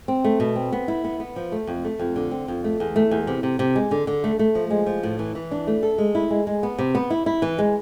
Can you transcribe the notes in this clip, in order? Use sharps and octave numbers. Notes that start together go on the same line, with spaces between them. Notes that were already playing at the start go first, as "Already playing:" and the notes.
C4
A3
B2
C4
B3
E4
B3
B3
F3
A3
F2
A3
F2
D3
C4
F2
A3
E2
A3
E2
C3
C3
C3
G#3
D3
D3
A3
A3
F3
G#3
F3
A2
E3
E3
D4
A3
A4
G#3
E4
G#3
G#3
B3
C3
B3
E4
E4
E3
G#3